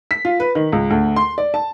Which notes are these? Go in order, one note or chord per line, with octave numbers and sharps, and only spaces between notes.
B6
F4
B4
D#3
C#2
D2
C6
D5
A5